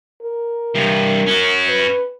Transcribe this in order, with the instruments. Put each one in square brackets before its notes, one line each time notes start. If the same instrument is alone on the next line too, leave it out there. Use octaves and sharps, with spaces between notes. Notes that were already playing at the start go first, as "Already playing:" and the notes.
[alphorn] A#4
[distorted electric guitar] G2 C3
C#4 F#4
[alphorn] B4